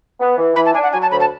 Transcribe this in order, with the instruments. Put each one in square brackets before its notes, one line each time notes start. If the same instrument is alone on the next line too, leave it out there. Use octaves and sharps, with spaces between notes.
[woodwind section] B3
E3
[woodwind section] E3 [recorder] B5
[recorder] A5
[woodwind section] D4 [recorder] G#5
[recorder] F#5
[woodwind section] F#3 [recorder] G#5
[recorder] A5
[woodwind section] D2 [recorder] B5
[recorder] A5